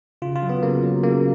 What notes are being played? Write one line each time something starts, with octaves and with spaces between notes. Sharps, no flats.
C#3 F4
F4
F#3
B3
C#3 A#3
F#3
C#3 A#3